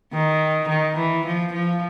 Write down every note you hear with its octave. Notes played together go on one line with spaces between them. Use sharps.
D#3
D#3
E3
F3
F3